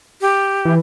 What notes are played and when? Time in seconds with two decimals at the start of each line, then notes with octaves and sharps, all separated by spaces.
0.22 G4
0.65 E3